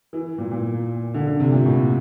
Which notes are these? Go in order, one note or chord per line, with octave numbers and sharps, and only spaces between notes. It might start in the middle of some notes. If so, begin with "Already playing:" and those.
E3
A#2
A#2
D3
D3
C3
A#2
A2